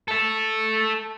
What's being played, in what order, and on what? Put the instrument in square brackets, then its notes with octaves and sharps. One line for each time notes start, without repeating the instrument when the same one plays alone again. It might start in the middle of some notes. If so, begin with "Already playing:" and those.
[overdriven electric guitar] A4 E5